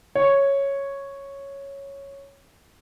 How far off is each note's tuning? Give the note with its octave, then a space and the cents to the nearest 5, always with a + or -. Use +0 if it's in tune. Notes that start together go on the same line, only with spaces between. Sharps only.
C#5 -5